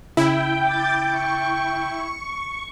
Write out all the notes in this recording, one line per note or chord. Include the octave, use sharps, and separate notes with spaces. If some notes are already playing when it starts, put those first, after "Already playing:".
C#3 E4 G5
G5 D6 G6 A6
C#6